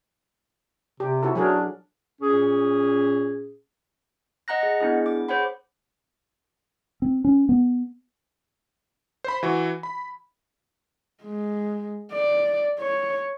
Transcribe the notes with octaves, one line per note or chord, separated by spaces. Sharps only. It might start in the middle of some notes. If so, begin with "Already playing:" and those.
C3 G4
E4 F#4 A4
F#3 D4 G#4 A#4
A#2 C#4 G#4
D#5 F#5 A#5 F#6 A#6
G#4 D#5 F#5
B3 D4 E4 G#4
D6
G#4 C5 C#5 F#5 B5
C4
C#4
B3
C5 B5
E3 F#4
B5
G#3
D5
C#5